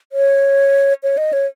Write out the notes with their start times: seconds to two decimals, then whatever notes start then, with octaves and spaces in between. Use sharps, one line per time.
0.12 C#5
1.03 C#5
1.17 D#5
1.33 C#5